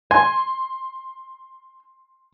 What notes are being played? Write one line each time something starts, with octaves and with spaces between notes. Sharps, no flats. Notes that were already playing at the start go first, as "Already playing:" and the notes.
G#5 C6